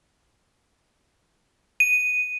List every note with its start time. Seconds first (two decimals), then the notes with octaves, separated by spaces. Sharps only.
1.80 D#7